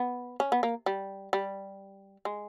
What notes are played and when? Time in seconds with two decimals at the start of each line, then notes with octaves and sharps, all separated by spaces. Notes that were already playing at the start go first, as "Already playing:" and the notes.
Already playing: B3
0.40 C#4
0.52 B3
0.63 A#3
0.86 G3
1.33 G3
2.25 G#3